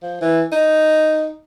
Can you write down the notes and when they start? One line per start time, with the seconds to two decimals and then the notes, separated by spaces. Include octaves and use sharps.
0.02 F3
0.21 E3
0.52 D#4